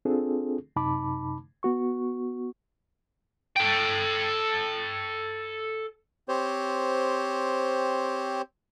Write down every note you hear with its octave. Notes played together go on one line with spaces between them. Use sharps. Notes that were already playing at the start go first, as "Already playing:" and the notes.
C4 D4 F4 G#4 A4
F#2 C3 D#4 A5 B5 D6
B3 F#4 C#6
A4 G5
C4 G4 C5 C#5